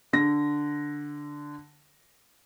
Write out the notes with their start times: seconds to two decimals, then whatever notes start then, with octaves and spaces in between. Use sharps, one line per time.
0.13 D3 A#6